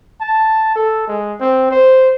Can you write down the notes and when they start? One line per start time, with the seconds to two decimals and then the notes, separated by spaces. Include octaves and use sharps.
0.21 A5
0.76 A4
1.08 G#3
1.40 C4
1.71 C5